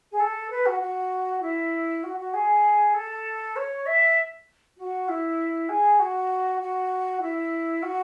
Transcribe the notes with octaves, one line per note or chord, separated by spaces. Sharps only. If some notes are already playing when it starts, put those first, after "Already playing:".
G#4
A4
B4
F#4
F#4
E4
F#4
F#4
G#4
A4
C#5
E5
F#4
E4
G#4
F#4
F#4
E4
F#4